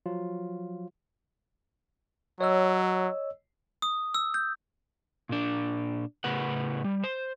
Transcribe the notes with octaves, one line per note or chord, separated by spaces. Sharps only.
F3 F#3 F4
F#3 C#5 D#5 E6
D#6
E6
G6
A#2 D4
A2 C#3 B4 F#5
G3
C5